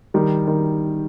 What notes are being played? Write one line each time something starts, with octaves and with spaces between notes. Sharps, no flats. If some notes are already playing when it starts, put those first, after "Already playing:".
D#3 G3
D#3